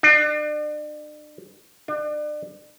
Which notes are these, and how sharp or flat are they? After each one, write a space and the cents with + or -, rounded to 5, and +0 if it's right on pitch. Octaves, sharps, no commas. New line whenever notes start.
D4 +40
D4 +35